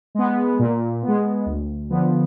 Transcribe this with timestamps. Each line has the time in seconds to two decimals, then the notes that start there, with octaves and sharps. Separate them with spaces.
0.15 G#3 B3
0.59 A#2
1.03 B3
1.08 G#3
1.46 D2
1.90 D3 F3 B3